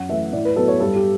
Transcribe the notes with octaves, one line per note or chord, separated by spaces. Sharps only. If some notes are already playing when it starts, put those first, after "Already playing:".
Already playing: F#2 F#5
E3 A3 E5
A2 D5
B4
F#3 B3 A4
C#5
G2 A4
G4